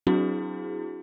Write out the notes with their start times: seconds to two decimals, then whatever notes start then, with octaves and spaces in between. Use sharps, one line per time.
0.07 F#3 C4 D4 E4 F#4 G#4